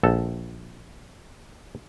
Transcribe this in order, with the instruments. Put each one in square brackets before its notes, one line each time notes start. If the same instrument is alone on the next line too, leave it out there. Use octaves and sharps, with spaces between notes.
[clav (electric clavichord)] A#1 A4